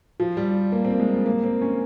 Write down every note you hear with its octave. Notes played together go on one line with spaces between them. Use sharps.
F3
G3
A#3
C4
A#3
G#3
A#3
C4
C#4